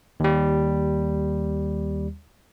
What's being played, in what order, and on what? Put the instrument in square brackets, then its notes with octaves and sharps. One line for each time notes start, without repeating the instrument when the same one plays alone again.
[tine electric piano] D#2 G3